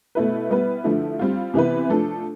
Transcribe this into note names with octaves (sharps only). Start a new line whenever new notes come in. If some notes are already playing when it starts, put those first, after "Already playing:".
B2 A3 E4 B4
G3 B3 E4 B4
D3 F3 A3 E4
G3 C4 F4
C3 E3 B3 E4 B4
F3 A3 D4 A4